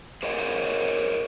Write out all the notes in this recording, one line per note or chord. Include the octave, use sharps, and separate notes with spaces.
G#4 A#4 C5 C#5 D#5